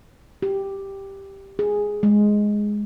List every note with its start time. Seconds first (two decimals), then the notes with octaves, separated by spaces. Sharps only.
0.42 G4
1.59 G#4
2.03 G#3